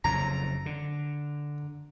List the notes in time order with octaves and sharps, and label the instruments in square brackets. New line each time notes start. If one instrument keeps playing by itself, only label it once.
[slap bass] F#1 F2 C#3 [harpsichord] A#5
[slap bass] D3